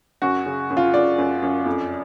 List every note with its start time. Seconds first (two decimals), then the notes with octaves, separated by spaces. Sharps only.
0.22 F#2 F#4
0.46 C#3
0.70 F#2
0.77 F4
0.94 F#2 D5
1.18 F#2
1.42 F#2
1.66 F2